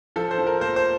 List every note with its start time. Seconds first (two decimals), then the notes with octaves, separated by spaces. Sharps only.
0.16 F3 A4
0.31 C5
0.39 F3
0.47 A#4
0.61 A#3 C5
0.76 C5